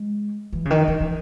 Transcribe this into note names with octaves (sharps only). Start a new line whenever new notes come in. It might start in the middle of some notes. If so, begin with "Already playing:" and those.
Already playing: G#3
E3
C#3
D#3
D#3
E3